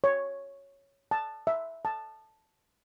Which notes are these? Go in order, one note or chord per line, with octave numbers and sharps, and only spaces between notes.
C#5
A5
E5
A5